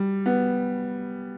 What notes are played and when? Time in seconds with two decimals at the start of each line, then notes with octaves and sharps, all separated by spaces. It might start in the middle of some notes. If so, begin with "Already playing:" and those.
Already playing: G3
0.26 B3